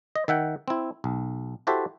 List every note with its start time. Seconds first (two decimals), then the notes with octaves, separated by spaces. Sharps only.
0.16 D#5
0.28 D#3 E5 F#5 G5
0.68 C4 E4
1.04 B1
1.67 E4 F#4 G4 A4 C5 E5